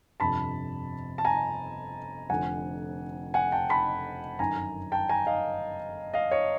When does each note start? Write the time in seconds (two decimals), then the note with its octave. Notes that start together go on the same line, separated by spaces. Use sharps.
0.20 G1 F2 C3 A5 B5
1.18 A5
1.25 G#5 A#5
2.30 F1 F2 D3 F#5 G#5
3.34 F#5 G#5
3.52 G5 A5
3.69 A5 B5
4.39 G1 F#2 D#3 G#5 A#5
4.92 G5 A5
5.09 G#5 A#5
5.27 D#5 F5
6.14 D#5 F5
6.31 C#5 D#5